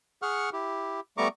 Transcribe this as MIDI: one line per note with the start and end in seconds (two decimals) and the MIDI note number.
0.22 0.50 68
0.22 0.50 78
0.22 0.50 85
0.22 0.50 89
0.53 1.00 64
0.53 1.00 67
1.18 1.28 55
1.18 1.28 57
1.18 1.28 59
1.18 1.28 82
1.18 1.28 85
1.18 1.28 86